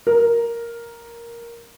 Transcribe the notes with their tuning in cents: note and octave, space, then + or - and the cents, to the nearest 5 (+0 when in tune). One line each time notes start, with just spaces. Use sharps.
A#4 +5